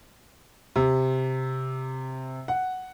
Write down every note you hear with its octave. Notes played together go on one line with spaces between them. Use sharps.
C3
F#5